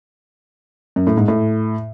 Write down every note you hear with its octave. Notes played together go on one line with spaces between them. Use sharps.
F#2
A2
G#2
A2